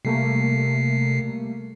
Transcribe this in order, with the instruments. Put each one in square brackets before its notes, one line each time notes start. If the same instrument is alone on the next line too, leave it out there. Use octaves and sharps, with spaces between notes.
[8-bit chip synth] C3 C7 [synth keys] G3 A3 A#3